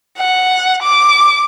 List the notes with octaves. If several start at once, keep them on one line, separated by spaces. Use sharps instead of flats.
F#5
D6